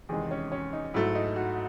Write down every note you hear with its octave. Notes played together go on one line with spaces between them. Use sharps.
E2 C3 D#3 G#3 G#4
C#4
C#4
D#4
G#2 F#3 A3 E4
D#4
F#4